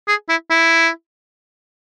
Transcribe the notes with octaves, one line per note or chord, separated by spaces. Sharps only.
G#4
E4
E4